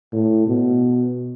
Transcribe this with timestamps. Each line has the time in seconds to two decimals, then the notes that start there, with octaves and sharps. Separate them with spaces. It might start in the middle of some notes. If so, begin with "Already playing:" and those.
0.13 A2
0.47 B2